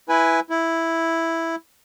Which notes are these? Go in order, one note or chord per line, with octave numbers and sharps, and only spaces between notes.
E4 B4 G#5
E4